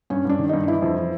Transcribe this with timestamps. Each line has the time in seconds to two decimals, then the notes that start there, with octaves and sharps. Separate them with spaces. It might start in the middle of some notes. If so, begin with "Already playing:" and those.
0.10 G2 C#4
0.25 G2 D4
0.39 D#3
0.49 G2 D#4
0.68 E3 E4
0.82 F2
0.96 E3